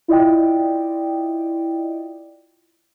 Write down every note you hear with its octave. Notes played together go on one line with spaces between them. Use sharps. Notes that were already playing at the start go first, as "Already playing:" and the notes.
E4 F4 D5 D#5 G5